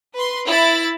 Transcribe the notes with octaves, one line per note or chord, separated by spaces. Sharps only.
B4 C6
E4 A6